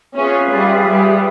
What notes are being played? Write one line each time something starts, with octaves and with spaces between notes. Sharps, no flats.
C#4 F4 G#4 B4 E5
G3
G3